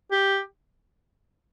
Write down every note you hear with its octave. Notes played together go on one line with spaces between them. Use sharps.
G4